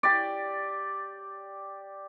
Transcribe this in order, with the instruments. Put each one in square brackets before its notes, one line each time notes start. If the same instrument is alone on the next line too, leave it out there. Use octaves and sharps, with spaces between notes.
[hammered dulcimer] G4 D5